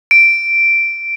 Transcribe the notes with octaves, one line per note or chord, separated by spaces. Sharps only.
D7